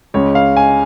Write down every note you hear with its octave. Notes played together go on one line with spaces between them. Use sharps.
C#2 C#3 G#3 C#5
F5
G#5